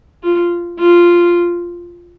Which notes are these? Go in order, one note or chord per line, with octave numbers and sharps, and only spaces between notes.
F4
F4